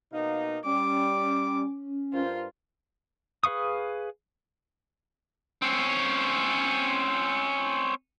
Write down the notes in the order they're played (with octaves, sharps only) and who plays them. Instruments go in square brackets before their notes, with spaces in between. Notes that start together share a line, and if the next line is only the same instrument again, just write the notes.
[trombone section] B2 A#3 D#4 [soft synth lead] F5
[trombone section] G3 [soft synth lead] C#4 [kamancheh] D6
[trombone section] G2 A#4 C5 [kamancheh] F4
[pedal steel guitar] G#4 B4 F5 C#6 D#6
[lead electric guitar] C4 C#4